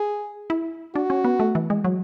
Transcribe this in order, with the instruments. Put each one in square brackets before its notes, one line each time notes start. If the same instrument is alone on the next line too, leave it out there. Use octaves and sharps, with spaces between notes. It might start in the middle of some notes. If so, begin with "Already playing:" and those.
Already playing: [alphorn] G#4
[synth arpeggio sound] E4
[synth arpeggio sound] D4 [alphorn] F#4
[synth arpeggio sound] C#4
B3
A3
E3
G#3
F#3